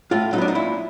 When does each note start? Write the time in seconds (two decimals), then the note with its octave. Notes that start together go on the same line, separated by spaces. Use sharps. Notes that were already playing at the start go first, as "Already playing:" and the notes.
0.11 A2 F4
0.33 F#3 D#4
0.38 B3 D4
0.48 D#4
0.55 A#2 E4